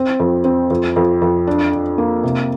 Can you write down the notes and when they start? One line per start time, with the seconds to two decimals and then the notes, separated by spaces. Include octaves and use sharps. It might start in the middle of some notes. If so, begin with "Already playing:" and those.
Already playing: C4
0.20 F2
0.45 C4
0.70 F2
0.96 F2
1.22 F2
1.47 D4
1.72 D4
1.98 A#3
2.23 C3